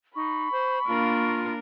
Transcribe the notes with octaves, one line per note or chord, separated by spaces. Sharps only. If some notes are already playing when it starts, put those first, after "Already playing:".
D#4 B5 C#6
C5
A#3 D4 F4 A#4